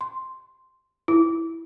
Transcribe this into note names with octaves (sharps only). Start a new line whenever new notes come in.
C6
E4